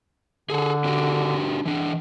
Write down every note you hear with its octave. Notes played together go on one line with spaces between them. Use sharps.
D3 G#4 A4
D4 F#4 G4
E3 D4